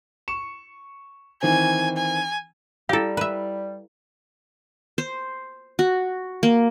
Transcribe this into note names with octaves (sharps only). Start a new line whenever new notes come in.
C#6 C#7 E7
D#3 E3 C4 G#5
G#5
G3 E4 G4 A4 F5
B4 E5
C5
F#4
A#3